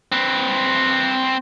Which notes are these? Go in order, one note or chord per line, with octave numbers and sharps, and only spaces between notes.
C4 B4